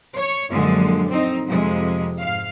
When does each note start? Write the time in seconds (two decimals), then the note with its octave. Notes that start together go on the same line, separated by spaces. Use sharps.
0.15 C#5
0.49 F#2 A#2 D3 F3 F#3 G#3
1.08 C4 D#4
1.46 F2 C3 G#3
2.19 G#2 F5